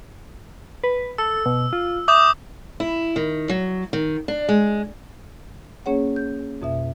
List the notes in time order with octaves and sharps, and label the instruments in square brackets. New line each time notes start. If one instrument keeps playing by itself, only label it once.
[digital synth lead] B4
[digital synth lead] A4 [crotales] E6
[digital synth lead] B2
F4
[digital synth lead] E5 [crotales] D6 D#6 G6
[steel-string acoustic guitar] E4
D#3
F#3
D#3
D4
G#3
[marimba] A#3 C#4 G#4 C#5 F#5
G6
F2 B2 E5